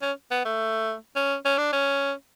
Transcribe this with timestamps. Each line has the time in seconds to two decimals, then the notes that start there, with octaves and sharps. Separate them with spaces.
0.02 C#4
0.31 B3
0.45 A3
1.16 C#4
1.45 C#4
1.58 D4
1.73 C#4